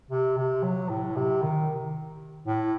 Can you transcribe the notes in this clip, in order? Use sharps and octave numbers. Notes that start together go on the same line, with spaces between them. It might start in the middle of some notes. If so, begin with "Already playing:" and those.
C3
C3
F#3
A2
C3
D#3
A2